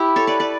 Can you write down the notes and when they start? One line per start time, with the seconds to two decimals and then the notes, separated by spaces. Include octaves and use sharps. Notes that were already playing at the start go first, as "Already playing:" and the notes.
Already playing: E4 G4
0.16 A4 C#5
0.27 B4 D5
0.40 B4 D5